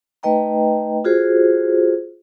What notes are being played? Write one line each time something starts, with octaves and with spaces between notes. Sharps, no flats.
A3 D#4 B4 D#5 G5 A#5
F4 F#4 G#4 A4 C5